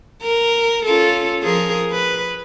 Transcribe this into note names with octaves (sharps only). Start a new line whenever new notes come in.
A#4
C#4 F4 A4
F3 G#4 A#4
B4